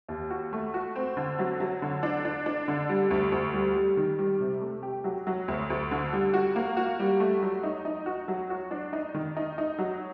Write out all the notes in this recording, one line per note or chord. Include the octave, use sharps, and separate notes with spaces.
D#2
F#4
A3
F#4
C4
D3
F#3
F#3
D3
D4
D4
D4
D3
G3
D2
D2
G3
G3
D#3
G3
C3
A3
G4
F#3
F#3
D2
D2
D3
G3
F#4
A#3
F#4
G3
A3
F#3
D#4
D#4
F#4
F#3
F#4
D4
D#4
D#3
D#4
D#4
F#3